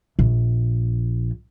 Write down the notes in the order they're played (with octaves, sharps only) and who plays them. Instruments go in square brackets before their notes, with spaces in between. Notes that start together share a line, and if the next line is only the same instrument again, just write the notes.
[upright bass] A#1